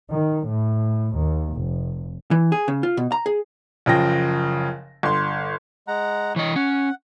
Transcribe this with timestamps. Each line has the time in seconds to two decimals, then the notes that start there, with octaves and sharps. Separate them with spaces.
0.11 D#3
0.48 A2
1.16 D#2
1.54 F1
2.31 E3
2.52 G#4
2.68 C#3
2.83 F4
2.97 B2
3.12 A#5
3.26 G#4
3.86 F#1 C#3 F3 G5 A#6
5.03 G1 C6
5.88 G#3 F#5 A#5
6.36 E3 C#5 D#5
6.56 C#4 F#5